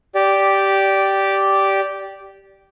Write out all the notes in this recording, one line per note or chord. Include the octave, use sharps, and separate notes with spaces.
G4 D5